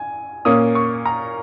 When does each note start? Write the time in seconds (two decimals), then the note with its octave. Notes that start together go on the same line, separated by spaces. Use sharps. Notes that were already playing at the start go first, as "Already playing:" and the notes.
Already playing: G#5
0.45 A#2 A#3 C#4 D#6
0.75 C#6
1.06 A#5